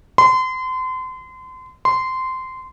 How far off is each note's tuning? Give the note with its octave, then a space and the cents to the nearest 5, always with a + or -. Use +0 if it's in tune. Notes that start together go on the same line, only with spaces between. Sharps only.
C6 -35
C6 -15